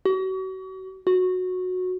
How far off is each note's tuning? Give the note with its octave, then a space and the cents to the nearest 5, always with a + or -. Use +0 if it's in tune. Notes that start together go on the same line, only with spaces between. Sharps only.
F#4 +35
F#4 -15